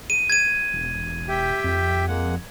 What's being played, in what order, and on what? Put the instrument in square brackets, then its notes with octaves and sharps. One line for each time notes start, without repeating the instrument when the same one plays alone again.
[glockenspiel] D#7
G#6 D#7
[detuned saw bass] E1
[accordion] G4 E5 G5
[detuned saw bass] F2
[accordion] G#3 A#3 F#5